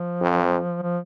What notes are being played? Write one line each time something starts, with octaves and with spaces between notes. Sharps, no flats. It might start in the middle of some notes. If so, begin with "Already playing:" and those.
Already playing: F3
F2
F3